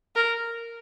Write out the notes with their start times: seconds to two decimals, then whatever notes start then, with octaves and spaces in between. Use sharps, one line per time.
0.16 A#4